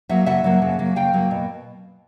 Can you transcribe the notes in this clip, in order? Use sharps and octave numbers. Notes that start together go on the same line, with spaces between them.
F#3 A#3 E5 F#5
C#3 E5 F#5
F#3 A#3
C#3
F#3 A#3
C#3 F5 G5
F#3 A#3
B2